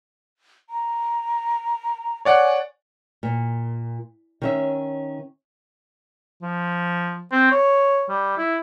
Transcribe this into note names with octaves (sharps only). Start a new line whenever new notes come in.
A#5
C#5 D5 F#5 G#5
A#2
D#3 C#4 E5
F3
C4
C#5
G3
E4